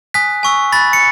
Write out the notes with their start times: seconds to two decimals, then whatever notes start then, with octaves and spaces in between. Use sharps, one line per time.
0.14 G#5 D#6 F#6 B6
0.43 G#5 C#6 E6
0.72 B5 F#6 A6
0.93 C#7